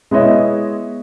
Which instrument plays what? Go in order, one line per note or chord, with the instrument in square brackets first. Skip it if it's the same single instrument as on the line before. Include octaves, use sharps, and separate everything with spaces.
[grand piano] G#3 B3 E4 C#5 D#5 E5